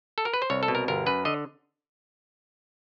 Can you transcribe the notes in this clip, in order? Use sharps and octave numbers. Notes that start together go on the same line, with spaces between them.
A4
A#4
B4
C5
C2 C#5
A4
B2
A#4
G1 A#4
F#2 B4
D3 D#5